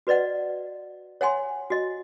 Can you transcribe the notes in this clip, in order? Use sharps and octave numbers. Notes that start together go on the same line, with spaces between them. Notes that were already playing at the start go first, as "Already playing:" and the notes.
F#4 B4 D5 D#5 F#5
C#5 F#5 G#5 C6
F#4 D#5